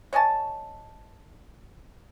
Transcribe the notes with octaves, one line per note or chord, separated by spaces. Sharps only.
C#5 D#5 G#5 A5